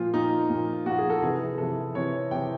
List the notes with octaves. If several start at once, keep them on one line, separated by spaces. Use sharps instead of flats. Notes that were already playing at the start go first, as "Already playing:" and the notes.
Already playing: A#2 F3 F4
A#2 F3 D#4
A#2
F3
A#2 F3 F#4
G#4
A4
C3 E3 G#4
C3 E3 A4
C3 E3 C#5
C3 E3 G5